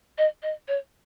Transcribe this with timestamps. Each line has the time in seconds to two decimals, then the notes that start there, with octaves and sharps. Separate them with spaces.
0.17 D#5
0.42 D#5
0.67 C#5